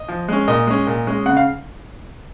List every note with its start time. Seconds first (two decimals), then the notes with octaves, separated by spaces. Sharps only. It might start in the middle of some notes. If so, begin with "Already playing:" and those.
Already playing: D#5
0.08 F3
0.28 G#3 C#4
0.48 A#2 D#5
0.67 G#3 C#4
0.87 A#2
1.07 G#3 C#4
1.26 C#3 F#5
1.37 F5